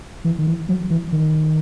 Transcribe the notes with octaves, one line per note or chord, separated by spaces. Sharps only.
E3
D#3
E3
F#3
E3
D#3